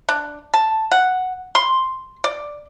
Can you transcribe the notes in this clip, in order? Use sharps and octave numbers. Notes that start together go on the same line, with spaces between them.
D4
A5
F#5
C6
D5